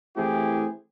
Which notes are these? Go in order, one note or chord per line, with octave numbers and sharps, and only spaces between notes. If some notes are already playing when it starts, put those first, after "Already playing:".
E3 A3 C4 E4 G4 G#4